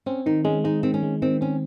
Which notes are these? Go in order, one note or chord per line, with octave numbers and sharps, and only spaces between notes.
C4 C#4
D#3 D#4
G#3 C#4
G#3 D#4
D#3 C4
C#4
G#3
D#3 C4
C4 C#4